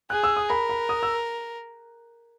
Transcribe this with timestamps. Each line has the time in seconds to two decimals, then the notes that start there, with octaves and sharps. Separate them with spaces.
0.10 G#4 F#6
0.24 E6
0.37 D#6
0.49 A#4 B5
0.70 B5
0.89 D#6
1.03 E6